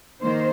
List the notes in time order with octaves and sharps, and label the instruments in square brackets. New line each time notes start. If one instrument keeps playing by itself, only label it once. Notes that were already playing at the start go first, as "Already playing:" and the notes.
[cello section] D#3 A#3 C5